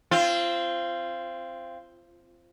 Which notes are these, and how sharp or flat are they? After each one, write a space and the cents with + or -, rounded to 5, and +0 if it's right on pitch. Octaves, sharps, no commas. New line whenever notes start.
C4 +0 F4 -25